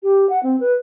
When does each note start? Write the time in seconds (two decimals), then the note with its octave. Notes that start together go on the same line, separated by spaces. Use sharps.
0.03 G4
0.29 F#5
0.43 C4
0.60 B4